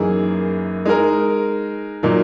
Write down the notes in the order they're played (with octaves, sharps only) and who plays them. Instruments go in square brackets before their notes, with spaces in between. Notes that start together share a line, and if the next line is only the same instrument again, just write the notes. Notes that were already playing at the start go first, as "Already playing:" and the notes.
Already playing: [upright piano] F#2 E3 A#3 D#4 G#4
G#3 D#4 A#4
A#2 F#3 A#3 D#4